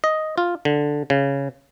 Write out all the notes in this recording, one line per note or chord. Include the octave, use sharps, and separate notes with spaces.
D#5
F4
D3
C#3